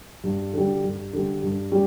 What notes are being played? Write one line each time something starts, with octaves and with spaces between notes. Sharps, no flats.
G2
D3 G3
G2
D3 G3
G2
G3